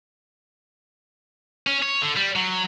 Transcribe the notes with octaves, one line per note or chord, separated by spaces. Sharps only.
C#4
C#5
D3
G3
F#3